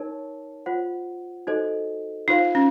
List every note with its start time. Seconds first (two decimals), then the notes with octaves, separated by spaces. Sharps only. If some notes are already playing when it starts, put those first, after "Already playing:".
Already playing: D#4 A#4 C#5 A5
0.66 F4 C5 F#5
1.47 D#4 F#4 A4 C5 D#5
2.28 D#4 F4 C5 F5
2.55 C#4